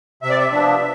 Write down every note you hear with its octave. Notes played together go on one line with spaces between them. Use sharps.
C3 E5
D5
E5
F3 B3 D4